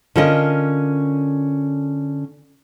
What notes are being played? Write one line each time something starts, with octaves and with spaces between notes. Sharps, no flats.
D3 C#4 F4 A#4 D#5